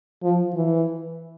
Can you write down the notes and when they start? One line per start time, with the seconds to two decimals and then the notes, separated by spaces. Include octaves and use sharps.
0.23 F3
0.55 E3